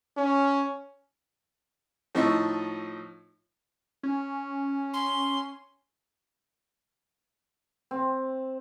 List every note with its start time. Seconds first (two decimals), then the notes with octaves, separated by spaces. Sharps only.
0.17 C#4
2.15 A2 F3 D#4 D#5 C#6 E6
4.03 C#4
4.94 C6
7.91 C4